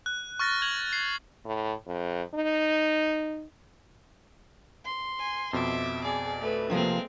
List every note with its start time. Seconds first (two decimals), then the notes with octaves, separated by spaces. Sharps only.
0.06 F#6
0.40 C#6 F6 A6 A#6
0.62 G#6 F7 F#7
0.93 C7
1.45 A2
1.87 F2
2.35 D#4
4.85 C6
5.19 G#5
5.53 F2 B2 E5 D6
6.04 G#4 D5
6.41 A3 B4
6.70 C3 F3 G#3 A#3 C4